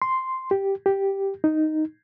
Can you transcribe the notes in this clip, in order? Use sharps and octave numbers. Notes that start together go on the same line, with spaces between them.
C6
G4
G4
D#4